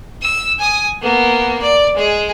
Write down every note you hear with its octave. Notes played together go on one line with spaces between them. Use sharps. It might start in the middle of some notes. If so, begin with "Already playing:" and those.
E6
G#5 D#6
A#3 B3
D5
G#3 G#4